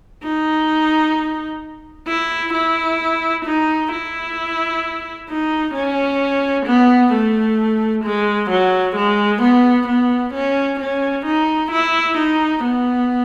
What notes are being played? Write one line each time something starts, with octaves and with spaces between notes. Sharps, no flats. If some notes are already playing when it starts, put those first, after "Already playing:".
D#4
E4
E4
D#4
E4
D#4
C#4
B3
A3
G#3
F#3
G#3
B3
B3
C#4
C#4
D#4
E4
D#4
B3